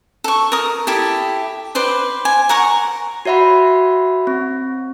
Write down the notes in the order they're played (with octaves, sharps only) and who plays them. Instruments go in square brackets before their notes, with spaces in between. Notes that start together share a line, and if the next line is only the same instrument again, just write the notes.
[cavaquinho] A4 C#6
A#4 D#6
E4 G4 A4
B4 C5 D5 C6
G#5
A#4 F#5 A#5 C#6
[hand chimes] F#4 C#5 E5 F#5 B5
C4